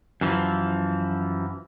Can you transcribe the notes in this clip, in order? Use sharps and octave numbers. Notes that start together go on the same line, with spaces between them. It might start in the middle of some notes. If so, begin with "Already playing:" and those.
F#2 E3 F3